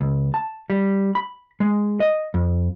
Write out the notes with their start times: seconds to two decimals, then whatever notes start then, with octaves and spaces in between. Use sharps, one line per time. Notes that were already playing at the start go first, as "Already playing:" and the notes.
0.01 C#2
0.34 A5
0.70 G3
1.15 B5
1.60 G#3
2.00 D#5
2.34 F2